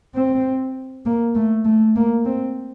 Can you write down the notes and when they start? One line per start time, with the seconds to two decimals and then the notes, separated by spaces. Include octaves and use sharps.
0.15 C4
1.06 A#3
1.35 A3
1.65 A3
1.96 A#3
2.25 C4